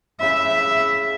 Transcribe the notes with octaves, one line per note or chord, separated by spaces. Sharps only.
C#3 E4 E5